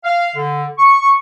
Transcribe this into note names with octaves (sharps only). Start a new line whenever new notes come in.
F5
D3
C#6